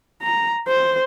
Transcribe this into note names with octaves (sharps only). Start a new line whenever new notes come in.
A#5
C5